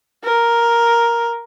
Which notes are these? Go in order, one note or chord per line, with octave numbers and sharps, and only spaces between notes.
A#4